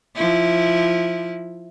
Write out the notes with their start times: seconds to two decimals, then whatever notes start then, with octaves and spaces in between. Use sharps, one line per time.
0.15 F3 E4